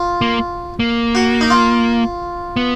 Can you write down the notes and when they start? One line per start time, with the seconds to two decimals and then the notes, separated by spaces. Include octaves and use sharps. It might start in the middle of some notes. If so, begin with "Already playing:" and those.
Already playing: F4
0.21 A#3
0.80 A#3
1.15 F#4
1.41 D#4
1.50 F4
2.56 B3